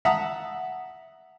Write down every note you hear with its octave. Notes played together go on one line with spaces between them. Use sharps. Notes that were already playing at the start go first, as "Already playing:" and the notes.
E5 F#5 A5 A#5 D#6 E6